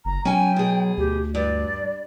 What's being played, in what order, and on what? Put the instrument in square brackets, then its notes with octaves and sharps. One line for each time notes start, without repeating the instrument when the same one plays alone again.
[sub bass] F#1 [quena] A#5
[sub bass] F#3 [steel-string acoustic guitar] C#4 G#5 [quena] G5
[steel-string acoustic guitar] B2 G#4
[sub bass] D2 [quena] G4
[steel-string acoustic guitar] G2 [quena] D5